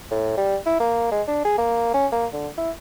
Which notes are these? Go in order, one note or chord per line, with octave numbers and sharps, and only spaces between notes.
A2
G3
E4
A#3
G#3
D4
G#4
A#3
C#4
A#3
D3
E4